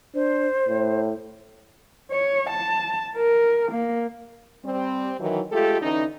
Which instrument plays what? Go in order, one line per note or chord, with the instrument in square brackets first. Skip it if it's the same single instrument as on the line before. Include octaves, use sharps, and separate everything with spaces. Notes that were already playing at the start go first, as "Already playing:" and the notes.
[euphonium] D4 [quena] C5
[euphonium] A2
[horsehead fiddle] C#5
A5
A#4
A#3
[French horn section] G3 C4
D#3 E3 F#3
G#3 A3 F4 G4 A4
D3 E3 C#4 D#4